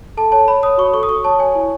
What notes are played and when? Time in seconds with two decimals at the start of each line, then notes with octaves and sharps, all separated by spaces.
0.17 A4 A5
0.32 C#5 A5
0.48 C#5 B5
0.63 C#5 D#6
0.78 F#4 C#6
0.94 A4 C#6
1.03 D#6
1.09 F#4 C#6
1.24 C#5 A5
1.39 C#5 G#5
1.55 E4